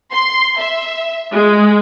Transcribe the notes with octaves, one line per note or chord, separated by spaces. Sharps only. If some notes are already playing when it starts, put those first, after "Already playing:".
C6
E5
G#3